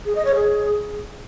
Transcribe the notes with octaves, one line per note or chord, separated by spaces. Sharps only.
G#4
D#5
C#5
G#4